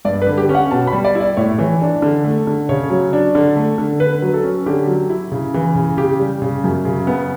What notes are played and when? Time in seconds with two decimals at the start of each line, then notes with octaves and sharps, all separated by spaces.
0.05 G2 D5
0.22 B4
0.27 D3
0.38 G4
0.49 C#4
0.55 F#5
0.71 B2 A5
0.87 B5
0.92 G3
1.05 D5
1.15 E4 D5
1.37 A2 C#5
1.58 E3
1.81 D4
2.02 D3
2.24 A3
2.47 D3
2.69 C#3 C#5
2.90 F#3
3.13 D4
3.35 D3
3.56 A3
3.78 D3
4.00 D3 B4
4.22 F#3
4.34 A4
4.43 C#4
4.66 D3 G4
4.87 F#3
5.10 E4
5.32 C#3
5.54 E3
5.75 C#3
5.97 C#3 G4
6.20 G3
6.42 C#3
6.64 F#2
6.85 C#3
7.07 B3